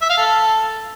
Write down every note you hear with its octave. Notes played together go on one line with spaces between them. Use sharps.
E5
F5
A4